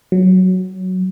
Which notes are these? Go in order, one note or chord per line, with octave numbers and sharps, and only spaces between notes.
F#3